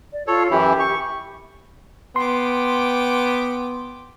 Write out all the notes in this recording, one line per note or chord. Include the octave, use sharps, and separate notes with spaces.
D5
F4 A4 C#5
F#2 E3 E4 G4
C#6
B3 G5 C6 D6